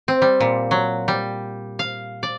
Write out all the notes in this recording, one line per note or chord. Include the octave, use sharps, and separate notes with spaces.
C4
G3
A#2
F#3
G3
F5
D5